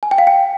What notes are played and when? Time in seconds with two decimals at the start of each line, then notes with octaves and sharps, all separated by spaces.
0.03 G#5
0.11 G5
0.18 F5
0.27 G5